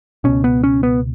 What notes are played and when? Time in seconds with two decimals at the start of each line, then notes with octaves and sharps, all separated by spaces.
0.24 C#2 B2 C#4
0.44 B3
0.63 C#4
0.83 B3